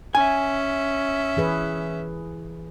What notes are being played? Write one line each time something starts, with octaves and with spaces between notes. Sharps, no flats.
C#4 E5 G#5
E3 G#4 B4